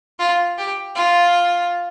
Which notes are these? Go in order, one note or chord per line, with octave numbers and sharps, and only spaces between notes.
F4
G4
F4